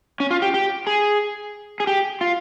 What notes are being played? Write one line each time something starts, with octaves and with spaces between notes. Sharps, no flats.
C#4
F4
G4
G4
G#4
G#4
G4
F4